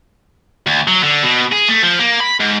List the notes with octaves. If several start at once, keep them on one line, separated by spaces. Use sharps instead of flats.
D2
F#3
D3
B2
G#4
A3
F3
A#3
B5
G#2